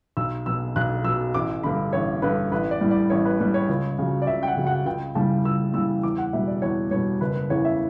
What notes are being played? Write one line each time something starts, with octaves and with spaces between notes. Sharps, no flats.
B1 E6
B2 F#3 E6
B1 F#6
B2 F#3 E6
A1 D6
G2 D3 B5
A1 C#5
G2 D3 B4
A1 B4
D5
A2 G3
D5
A1 C#5
B4
A2 G3 B4
C#5
C#2
C#3 F#3
D5
C#2 E5
G5
F#5
C#3 F#3
F#5
C#2 G5
C#3 E3 G3 A5
C#2 E6
C#3 E3 G3 E6
E2 D6
F#5
B2 G3 E5
D5
E2 C#5
B2 G3 C#5
F#1 B4
B4
E2 C#3 E3 C#5
E5